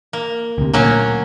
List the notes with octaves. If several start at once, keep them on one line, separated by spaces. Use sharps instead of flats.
A#3
D2 C3
D2 A#2 F#3 A#3 C#4